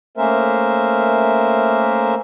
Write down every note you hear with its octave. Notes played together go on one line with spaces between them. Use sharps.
A3 A#3 C#4 A#4 C5 E5